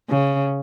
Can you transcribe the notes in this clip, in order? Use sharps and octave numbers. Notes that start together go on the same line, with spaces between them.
C#3